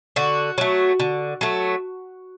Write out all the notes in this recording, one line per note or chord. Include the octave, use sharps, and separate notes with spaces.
D3 F#4
F#3 A3
D3
F#3 A3